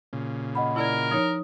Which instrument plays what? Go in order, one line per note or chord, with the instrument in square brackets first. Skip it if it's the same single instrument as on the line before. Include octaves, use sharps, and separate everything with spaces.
[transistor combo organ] A#2 C#3
[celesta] D#5 F#5 B5
[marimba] E4 D5 G#6 [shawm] A#4
[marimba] F3 D#4 C#5 [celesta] D#6